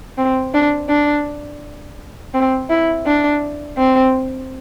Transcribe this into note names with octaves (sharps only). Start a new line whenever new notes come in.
C4
D4
D4
C4
E4
D4
C4